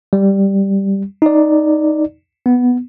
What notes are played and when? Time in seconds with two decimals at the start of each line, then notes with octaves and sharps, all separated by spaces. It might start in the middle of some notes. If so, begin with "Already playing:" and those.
0.13 G3
1.22 D#4 D5
2.46 B3